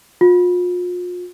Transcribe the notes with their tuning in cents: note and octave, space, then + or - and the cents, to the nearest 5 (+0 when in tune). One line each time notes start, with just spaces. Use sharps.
F4 +40